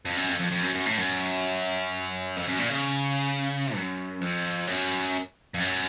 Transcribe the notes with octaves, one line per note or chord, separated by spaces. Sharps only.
F2
F#2
F2
F2
F2
F#2
F#2
A2
F#2
F2
F#2
A#2
C#3
F#2
F2
F#2
F2
F#2